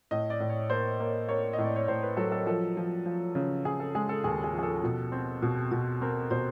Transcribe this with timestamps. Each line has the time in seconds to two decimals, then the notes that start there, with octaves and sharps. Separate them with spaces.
0.11 A2 D#5
0.30 D5
0.40 A2
0.50 C#5
0.70 A#3 C5
1.00 A#3
1.29 A#3 C#5
1.53 A2 D#5
1.64 D5
1.76 C#5
1.88 A2 C5
2.03 B4
2.17 F#3 A4
2.32 A4
2.46 F3 A4
2.77 F3
3.06 F3
3.35 C#3
3.65 C#3 G#4
3.80 A4
3.95 G#3 G#4
4.09 A4
4.24 D#2 G#4
4.44 G#4
4.53 F3
4.59 G#4
4.63 A4
4.84 B2
5.12 C4
5.42 B2
5.72 B2
6.02 C4 A#4
6.30 B2 C5